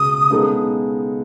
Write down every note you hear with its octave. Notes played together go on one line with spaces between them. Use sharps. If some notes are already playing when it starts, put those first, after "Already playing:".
Already playing: C#2 B2 G#3 B3 D#6
C#3 G#3 B3 D#4 A4